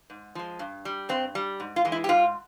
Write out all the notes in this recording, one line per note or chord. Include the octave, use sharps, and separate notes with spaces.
G#2
F3 G#3
G2
G3
G2 C4
G3
G#2
F4
E3 G#3
E4
G4
G#2 F4